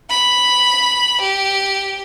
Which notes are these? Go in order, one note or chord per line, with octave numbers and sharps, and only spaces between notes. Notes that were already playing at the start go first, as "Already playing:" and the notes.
B5
G4